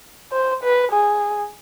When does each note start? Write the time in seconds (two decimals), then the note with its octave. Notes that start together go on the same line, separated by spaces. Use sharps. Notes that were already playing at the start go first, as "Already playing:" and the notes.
0.32 C5
0.63 B4
0.92 G#4